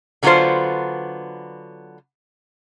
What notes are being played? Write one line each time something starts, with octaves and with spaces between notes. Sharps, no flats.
D3 F#3 B3 D#4 F4 C5